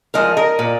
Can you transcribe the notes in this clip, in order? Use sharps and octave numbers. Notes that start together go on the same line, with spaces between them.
F3 G#3 A#4 D#5
A#4 D#5
A#2